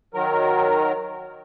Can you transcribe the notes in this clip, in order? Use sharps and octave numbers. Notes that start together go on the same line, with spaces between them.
D#3 F#3 A#4